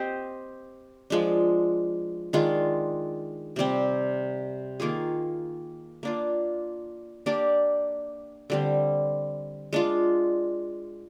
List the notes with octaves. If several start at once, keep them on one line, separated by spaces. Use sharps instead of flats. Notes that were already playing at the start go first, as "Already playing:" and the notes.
Already playing: C4 G4 C5 D#5
F3 G#3 D4
D#3 G#3 D4 F4
C3 G3 C4
D#3 A#3 F4 G#4
A#3 D4 F4
A#3 D4 G4 D5
D3 G3 C4
G#3 D4 F4